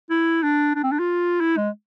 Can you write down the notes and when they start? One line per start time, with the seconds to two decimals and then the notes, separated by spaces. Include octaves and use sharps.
0.10 E4
0.42 D4
0.75 D4
0.83 C4
0.91 D4
0.99 F4
1.40 E4
1.57 G#3